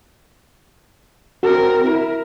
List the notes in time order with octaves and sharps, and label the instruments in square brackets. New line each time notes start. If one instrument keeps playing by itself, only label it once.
[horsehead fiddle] C4 A#4 [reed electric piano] F#4
[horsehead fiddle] E4 A#4